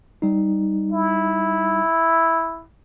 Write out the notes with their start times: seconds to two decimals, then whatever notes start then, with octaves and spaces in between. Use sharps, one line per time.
0.22 G3 D#4
0.92 E4